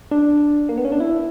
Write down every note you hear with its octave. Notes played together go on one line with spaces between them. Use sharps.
D4
A#3
B3
C#4
D4
E4